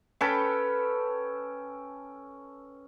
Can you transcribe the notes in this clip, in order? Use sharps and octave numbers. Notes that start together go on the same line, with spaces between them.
C#4 A4 B4 G5